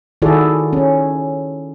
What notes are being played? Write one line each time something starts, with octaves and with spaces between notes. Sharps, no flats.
D#3 E4 F#4 G#4 A4 D5
C#4